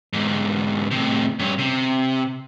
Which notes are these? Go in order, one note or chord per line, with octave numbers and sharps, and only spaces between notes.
E2 G#2
A2 C3
G2 C#4
C3